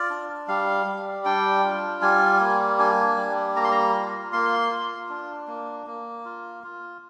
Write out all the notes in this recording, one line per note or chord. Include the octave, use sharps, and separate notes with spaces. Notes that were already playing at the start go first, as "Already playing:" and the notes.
Already playing: F4 D5
D4
G3 F5
G3
D4 G5
F4
G3 G#5
A#3
D4 G#5
G3
A#3 A#5
C6
A#5
F4
A#3 C6
F4
D4
A#3
A#3
F4
F4